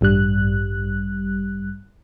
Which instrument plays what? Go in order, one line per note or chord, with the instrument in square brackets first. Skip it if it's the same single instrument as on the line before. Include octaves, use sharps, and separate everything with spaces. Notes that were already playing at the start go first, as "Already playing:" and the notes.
[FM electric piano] A1 G2 G3 F#6